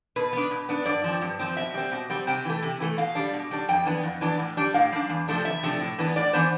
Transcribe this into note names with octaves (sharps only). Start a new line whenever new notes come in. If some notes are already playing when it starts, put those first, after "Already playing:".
B2 B4
B3 D4
B2
B3 D4
G2 D5
F3 C4
G2
F3 C4
B2 E5
G3 C4
B2
G3 C4
C3 G5
E3 A3
C3
E3 A3
B2 F5
G3 D4
B2
G3 D4
F2 G5
E3 B3 D4
F2
E3 B3 D4
A2
G3 D4
A2 F5
G3 D4
E2
C3 F3 A3 D4
E2 E5
C3 F3 A3 D4
A2
E3 B3 D4
A2 D5
E3 B3 D4 C5